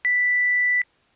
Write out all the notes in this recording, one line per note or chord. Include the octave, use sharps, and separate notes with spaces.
B6